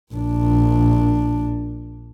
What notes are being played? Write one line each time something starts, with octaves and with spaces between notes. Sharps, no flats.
A#1 D4